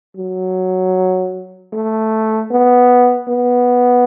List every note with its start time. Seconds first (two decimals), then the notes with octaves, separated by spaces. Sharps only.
0.17 F#3
1.73 A3
2.51 B3
3.28 B3